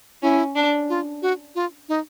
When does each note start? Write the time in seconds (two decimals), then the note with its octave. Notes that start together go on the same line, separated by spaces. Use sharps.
0.22 C#4 E4
0.56 D4
0.89 F4
1.22 F#4
1.55 F4
1.89 D#4